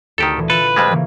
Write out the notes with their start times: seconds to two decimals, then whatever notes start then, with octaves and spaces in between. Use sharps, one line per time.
0.18 D2 D#3 G4 A4
0.37 A#2 E3
0.50 F4 A4 B4
0.76 F2 G3 G#3
0.90 C#3 E3 A#3